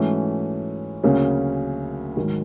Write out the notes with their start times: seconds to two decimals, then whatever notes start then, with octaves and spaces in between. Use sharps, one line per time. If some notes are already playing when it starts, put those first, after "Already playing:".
Already playing: G#2 E3 A3 C#4 F#4
1.03 D2 C#3 F#3 A#3 C#4
2.17 G#2 D#3 F#3